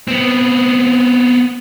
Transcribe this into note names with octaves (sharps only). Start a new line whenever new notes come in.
B3 C4